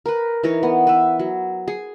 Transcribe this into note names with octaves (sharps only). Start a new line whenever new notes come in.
A#4 B4
E3 D#4 A#4 C#5
B3
B4 E5
F#3
G#4